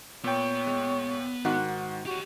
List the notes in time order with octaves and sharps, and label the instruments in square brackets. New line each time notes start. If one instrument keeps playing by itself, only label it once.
[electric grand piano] A#2 G5 [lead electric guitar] B3 [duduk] C#5
[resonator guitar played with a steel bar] G#3
[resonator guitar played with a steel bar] G#2 F#4 [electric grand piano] D#3
[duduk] F#4 [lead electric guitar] G4 C#5